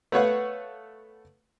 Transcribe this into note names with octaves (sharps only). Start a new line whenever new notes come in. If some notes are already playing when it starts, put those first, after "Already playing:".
A3 B3 B4 C#5 F5 F#5